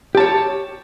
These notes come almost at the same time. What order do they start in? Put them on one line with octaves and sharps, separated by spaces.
G4 A5 C#5